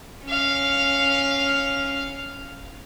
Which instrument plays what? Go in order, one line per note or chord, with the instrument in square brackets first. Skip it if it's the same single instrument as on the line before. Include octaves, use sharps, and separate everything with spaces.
[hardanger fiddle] C#4 F5